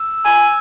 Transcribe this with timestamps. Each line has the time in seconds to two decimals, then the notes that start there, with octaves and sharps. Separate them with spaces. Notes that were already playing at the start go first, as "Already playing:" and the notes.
Already playing: E6
0.25 G#5